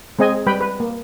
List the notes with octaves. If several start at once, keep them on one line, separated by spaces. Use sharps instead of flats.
G#3 C4 G#4 D#5 G#5
G3 B4 G5 B5
B4
A#3